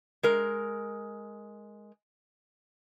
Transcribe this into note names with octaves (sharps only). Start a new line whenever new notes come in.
G#3 A#4